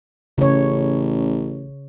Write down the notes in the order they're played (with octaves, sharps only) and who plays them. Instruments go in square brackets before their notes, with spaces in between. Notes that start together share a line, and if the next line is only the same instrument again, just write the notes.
[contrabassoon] A1 [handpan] C#3 C#5